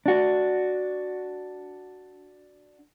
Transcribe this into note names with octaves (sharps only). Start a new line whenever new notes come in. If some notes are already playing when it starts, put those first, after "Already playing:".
D4 F#4